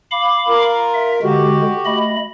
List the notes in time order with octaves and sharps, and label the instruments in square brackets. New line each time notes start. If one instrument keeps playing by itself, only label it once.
[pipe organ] F5 B5 D6
[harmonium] F4 A#4
[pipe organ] E5
[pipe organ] D3 G#3 [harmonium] F#4 G4
[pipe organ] A3 D#5 B5